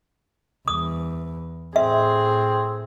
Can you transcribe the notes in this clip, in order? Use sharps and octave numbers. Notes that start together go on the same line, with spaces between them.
E2 D#6
A2 C4 G#4 E5